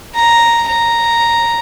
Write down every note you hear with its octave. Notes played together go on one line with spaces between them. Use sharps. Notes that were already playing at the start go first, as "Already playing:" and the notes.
A#5
A#5